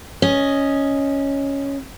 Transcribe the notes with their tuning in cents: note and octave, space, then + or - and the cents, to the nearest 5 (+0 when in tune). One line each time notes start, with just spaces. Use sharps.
C#4 +0 D#5 +0